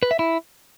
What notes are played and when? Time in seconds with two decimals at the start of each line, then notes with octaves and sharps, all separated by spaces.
0.03 B4
0.11 E5
0.19 E4